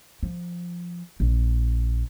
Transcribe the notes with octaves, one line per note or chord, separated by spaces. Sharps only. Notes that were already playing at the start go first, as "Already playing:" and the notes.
F3
A#1